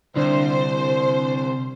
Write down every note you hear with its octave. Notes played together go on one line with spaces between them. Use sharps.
C2 D3 D4 C5